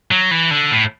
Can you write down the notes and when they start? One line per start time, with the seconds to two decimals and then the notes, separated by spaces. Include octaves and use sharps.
0.11 F#3
0.31 E3
0.51 D3
0.71 A2